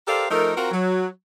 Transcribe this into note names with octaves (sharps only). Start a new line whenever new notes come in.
G4 A4 A#4 C5 D5 F5
F3 A3 D#4 A4 A#4
C4 F4 F#4 A#4
F#3